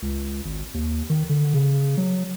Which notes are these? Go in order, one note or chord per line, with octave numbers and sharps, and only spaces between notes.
C#2
G#1
D#2
D#3
D3
C#3
F#3